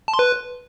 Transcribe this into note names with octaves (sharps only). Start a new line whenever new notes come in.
A5
C6
B4